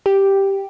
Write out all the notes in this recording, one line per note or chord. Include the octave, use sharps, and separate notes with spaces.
G4